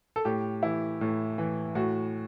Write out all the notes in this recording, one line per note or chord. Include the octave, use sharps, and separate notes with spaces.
A4
A2 G4
E3 E4
A2
E3
A2 F#4